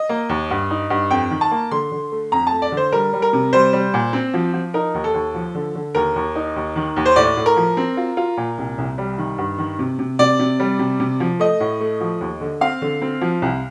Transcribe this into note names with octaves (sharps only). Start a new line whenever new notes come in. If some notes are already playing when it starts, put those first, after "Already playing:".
Already playing: D#5
A#3
D#2
G2
D#4
G2
F2 G5
D#3
A5
A#3
D3 C6
D3
A3
F2 A#5
A5
A3
D5
D3
C5
G3 A#4
G3
A#4
C3
G3 C5
G3
A#2
C4
F3
F3
D#4 A#4
D#2
A4
D#2
F3
D3
D3
D#2 A#4
D#2
D#4
D#2
D#3
D#2
C5
A2 D5
A2
A#4
F3
C4
F4
F4
A#2
C2
C2
G3
D#3
G2
D#3
C3
C3
C3 D5
C3
G3
C3
C3
F3
A3 D#5
A2
A3
F3
D#2
D3
C4 F5
D3
C4
F3
C2